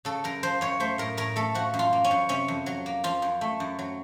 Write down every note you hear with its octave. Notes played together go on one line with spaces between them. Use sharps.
C#3 A4
F#2 A#4
F3 C5
F#2 C#5
A3 C5
A2 A#4
A2 A#4
A3 A4
F3 F#4
F#2
F4
A#3
C#4
F#2
C3 C#4
F2
F#3
A#3
F3 F4
F#2
A3
F#2
F#3